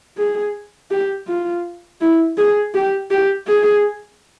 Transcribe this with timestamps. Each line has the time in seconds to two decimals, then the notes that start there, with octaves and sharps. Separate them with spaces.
0.18 G#4
0.91 G4
1.28 F4
2.01 E4
2.38 G#4
2.74 G4
3.11 G4
3.47 G#4